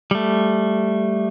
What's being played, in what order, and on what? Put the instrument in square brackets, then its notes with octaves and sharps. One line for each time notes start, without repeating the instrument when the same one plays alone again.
[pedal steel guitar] G3 A3